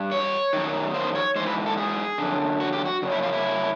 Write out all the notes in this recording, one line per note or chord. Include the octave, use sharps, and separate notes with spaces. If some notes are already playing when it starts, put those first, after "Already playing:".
Already playing: G2
C#5
F#2 D#3
C5
C#5
G#2 E3 C5
B4
A4
G#4
F#2 D3
F#4
G4
F#4
F#2 C#3
E4
F4
E4